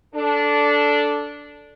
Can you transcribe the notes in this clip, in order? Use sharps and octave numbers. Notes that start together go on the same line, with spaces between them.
D4 A4